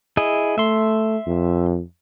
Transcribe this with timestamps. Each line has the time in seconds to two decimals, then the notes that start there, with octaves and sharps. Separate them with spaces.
0.17 E4 G#4 D#5
0.58 A3 E5 C6
1.27 F2